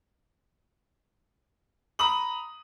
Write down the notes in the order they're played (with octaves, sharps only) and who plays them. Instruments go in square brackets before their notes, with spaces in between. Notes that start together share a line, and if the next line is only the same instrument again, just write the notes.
[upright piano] A#5 B5 D#6 F#7